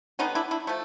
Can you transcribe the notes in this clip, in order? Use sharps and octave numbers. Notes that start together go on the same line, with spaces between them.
D3 G3 B3 C#4 D#4
D4 E4
D4 E4
F3 A3